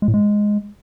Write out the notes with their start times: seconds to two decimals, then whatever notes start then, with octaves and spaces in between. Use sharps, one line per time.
0.02 G#3
0.08 A2
0.14 G#3